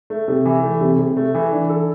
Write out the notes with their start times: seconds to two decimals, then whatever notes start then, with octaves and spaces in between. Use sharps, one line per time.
0.10 A3
0.28 C3
0.45 E3
0.64 A3
0.81 C3
0.99 C3
1.17 A3
1.34 E3
1.52 D4
1.69 A4